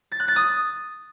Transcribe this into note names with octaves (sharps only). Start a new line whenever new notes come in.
A6
F#6
A6
D#6